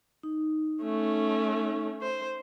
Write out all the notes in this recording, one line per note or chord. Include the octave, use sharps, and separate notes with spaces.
D#4
A3 C#4
C5